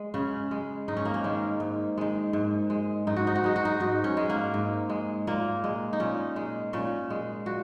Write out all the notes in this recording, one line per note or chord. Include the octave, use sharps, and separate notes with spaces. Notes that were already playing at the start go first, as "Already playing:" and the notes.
Already playing: G#3
C#3 C#4
G#3
G#2 D#4
C#4
A#3
C#4
D#3 G#3
G#2
D#3 G#3
G#2
G#3
G#2 D#4
F#4
D#4
F#4
G#3 D#4
F#4
D#4
G#2 F#4
C#4
G#3
A#3
G#2
G#3
A#2 A#3
G#3
D#4
A#2 C#4
G#3
A#2 C#4
G#3
A#2 F#4